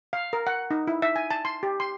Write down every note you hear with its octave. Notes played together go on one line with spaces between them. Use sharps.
F5
A#4
F#5
D#4
E4
E5
G#5
A5
C6
G4
C6